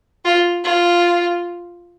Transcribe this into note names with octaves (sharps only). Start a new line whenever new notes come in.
F4
F4